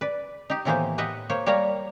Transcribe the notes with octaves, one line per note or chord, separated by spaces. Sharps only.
B4 D5
D#4 G4
A2 D#3 E3 A#3 B3 C5
G4 B4 D#5 E5 F#5
A#3 C5 C#5
G3 A#3 C#5 F5 A#5